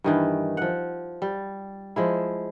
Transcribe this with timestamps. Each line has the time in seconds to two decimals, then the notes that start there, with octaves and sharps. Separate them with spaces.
0.04 G2 D#3 E3
0.57 F3 F#5
1.22 G3
1.96 F3 G#3 E4